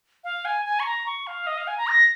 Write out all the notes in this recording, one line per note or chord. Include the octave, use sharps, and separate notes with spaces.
F5
G#5
G#5
C#6
A#5
C#6
F5
D#5
F5
G#5
A#5
A#6